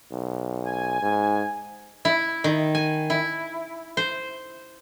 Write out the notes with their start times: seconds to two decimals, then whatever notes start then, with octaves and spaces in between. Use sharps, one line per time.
0.12 B1
0.66 G#5
1.02 G#2
2.05 E4
2.44 D#3
2.75 G#5
3.10 E4
3.97 C5